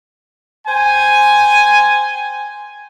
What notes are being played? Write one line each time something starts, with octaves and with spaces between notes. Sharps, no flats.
C5 G5 G#5